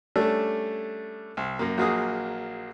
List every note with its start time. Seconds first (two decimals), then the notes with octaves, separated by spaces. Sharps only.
0.16 G3 A3 C#4 D4 A4
1.37 C2
1.59 F#2 A#3
1.77 A#1 F#3 A#3 G#4 D#6